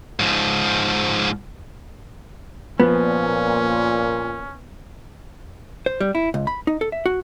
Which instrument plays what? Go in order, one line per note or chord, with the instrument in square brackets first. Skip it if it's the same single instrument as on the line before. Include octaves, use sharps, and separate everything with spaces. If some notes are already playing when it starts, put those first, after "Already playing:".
[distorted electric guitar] G#2 F3
[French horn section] A#2 [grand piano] F3 [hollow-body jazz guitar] B3 [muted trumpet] C#4
[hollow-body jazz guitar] C5
G3
E4
C#2
B5
D#4
A4
E5
F#4